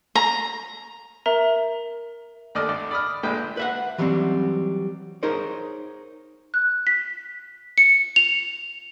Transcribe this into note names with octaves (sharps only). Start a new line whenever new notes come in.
A#5
A#4 E5 A#5
D#2 D3 A3 D5 D#5 F6
G#1 D3 D5
D5 B5 D#6 F6
A#1 A#2 D3 G#3 B4 G5
B4 E5 F#5
E3 F#3 G3 A3 C4
D#4 G#4 A#4 C5 C#5
F#6
B6
C#7
F7